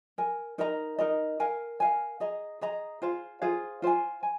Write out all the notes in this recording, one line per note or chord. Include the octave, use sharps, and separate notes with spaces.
A#4 G#5
D#4 A#4 D#5 A#5
D#4 A#4 D#5 A#5
A#4 F5 G#5
A#4 F5 G#5
G#4 D#5 A#5
G#4 D#5 A#5
F4 G#4 C5 F5
F4 G#4 C5 F5
F4 C5 F5 G#5
G#5